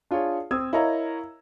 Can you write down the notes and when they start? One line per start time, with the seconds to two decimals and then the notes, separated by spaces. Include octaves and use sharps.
0.11 D4 F4 G#4 C#5
0.51 C4 C5 D#6 E6 G#6
0.73 E4 A#4 C#5 D#5 F5 A#5